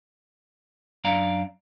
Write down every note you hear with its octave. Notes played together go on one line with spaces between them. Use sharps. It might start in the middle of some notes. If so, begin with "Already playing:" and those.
F#2 D4 D5 F5 A#5